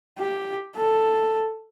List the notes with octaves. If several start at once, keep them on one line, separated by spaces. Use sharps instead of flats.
G4
A4